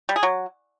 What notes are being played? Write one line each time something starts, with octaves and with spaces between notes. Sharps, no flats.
G3
G#4
F#3